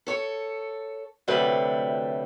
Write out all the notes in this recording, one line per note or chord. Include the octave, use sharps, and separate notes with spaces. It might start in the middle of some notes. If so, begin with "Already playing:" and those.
A4 C#5
D2 C3 F#3 G3 A3 B4